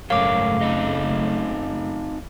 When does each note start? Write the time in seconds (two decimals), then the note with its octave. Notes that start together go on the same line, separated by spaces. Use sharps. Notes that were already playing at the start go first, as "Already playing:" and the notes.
0.10 F#1 G#2 C#3 A3 A#4 C#5 F5 D6
0.61 C4 D#4 D#5